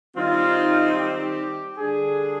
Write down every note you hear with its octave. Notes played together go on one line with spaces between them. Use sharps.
D#3 G3 C4 D#4 F4
G4
D3 G3 D4 G#4